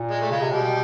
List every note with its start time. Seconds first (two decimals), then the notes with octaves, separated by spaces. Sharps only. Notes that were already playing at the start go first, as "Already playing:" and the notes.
Already playing: A#2
0.11 G#3
0.21 A3
0.31 C#3 G#3
0.41 C3
0.52 B2 G3